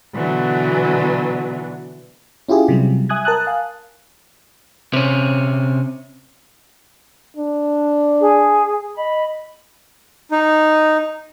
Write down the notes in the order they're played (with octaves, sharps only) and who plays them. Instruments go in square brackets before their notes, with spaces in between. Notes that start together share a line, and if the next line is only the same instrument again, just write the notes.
[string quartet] B2 D3 E3 F#3 B3
[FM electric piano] C#4 E4 F4 G4 G#4
C3 F#3 G3
E5 G#5 D#6 F#6 G#6
A#4 A5 D#6 F#6
F5 G#5
[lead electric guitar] C3 C#4
[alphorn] D4
[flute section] G#4
D#5 B5
[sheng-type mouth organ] D#4